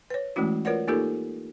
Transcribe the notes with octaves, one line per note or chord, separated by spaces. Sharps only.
B4 C#5
E3 G#3 A3 C#4 E4 F#4
F4 A#4 B4 C#5 D5 F#5
A#3 D#4 F4 G4 A4 A#4